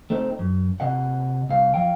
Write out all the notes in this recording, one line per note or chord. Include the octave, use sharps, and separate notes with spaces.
A3 C4 D#4
F#2
C3 D#5 F#5
C2 F5
F3 F5 G5